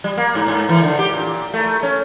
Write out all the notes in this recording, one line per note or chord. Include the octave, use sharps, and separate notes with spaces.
G3
A#3
G#2
G#2
E3
D3
G4
A#2
A3
C#4